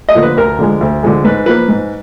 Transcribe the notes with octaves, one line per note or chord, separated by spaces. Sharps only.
D#5
D3 F3 A#3
B4
D2 A#4
D3 F3 G#3
D2
D3 F3 G#3
G#2 B4
F3 A#3 B4
G#2